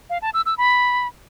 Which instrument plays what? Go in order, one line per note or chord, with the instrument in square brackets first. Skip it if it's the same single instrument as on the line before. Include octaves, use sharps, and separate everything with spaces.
[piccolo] F5
A5
E6
E6
B5